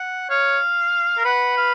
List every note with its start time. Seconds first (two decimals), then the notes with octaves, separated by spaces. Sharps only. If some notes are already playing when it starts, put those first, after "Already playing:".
Already playing: F#5
0.30 C#5 F5
1.17 A#4
1.25 B4 F#5
1.57 F5